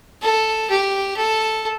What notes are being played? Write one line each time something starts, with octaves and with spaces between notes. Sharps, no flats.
A4
G4
A4